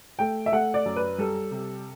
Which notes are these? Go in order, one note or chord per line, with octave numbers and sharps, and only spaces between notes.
A3 G5
E5
A3 F#5
D5
F#2
B4
G3 A4
C3